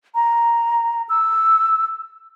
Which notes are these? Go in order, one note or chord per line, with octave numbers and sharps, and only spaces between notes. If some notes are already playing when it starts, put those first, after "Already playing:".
A#5
E6